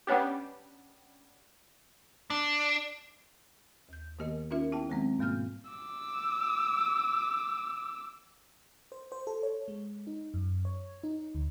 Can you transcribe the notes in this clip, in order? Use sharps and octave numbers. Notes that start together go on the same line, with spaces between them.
G3 B3 C#4 D4 G4
D4
D#2 G6
D#3 A#3 B3 G4 A#4 D#5
C#4 D#4 F4 G4 A#4 E5
B3 E4 G4 G5 A5
D#3 F#3 G#3 B3 C4
G#2 B2 G3 A#3 F6 G6
D6 E6
C5
C5
A4
C#5
G#3
D#4
F#2
C#5
D#4
D2